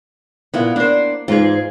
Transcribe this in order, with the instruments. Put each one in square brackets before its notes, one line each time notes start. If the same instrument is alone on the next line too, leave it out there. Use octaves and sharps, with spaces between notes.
[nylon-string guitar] A#2 E4 F5 [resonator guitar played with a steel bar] B3
[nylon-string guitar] A#3 [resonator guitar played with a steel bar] D4 C5
[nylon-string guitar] E2 G#2 [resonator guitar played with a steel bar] F4 G#4